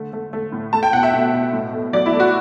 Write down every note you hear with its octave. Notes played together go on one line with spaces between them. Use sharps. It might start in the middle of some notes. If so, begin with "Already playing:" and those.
Already playing: D3 A3
A3
A3
A2
A3 A5
G5
B2 F#5
E5
B2
B2
A2
A3
F#3 D5
E4
A3
F#4